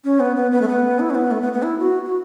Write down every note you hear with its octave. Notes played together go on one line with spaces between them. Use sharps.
C#4
B3
B3
B3
A3
B3
E4
C#4
B3
A3
B3
B3
E4
F#4
F#4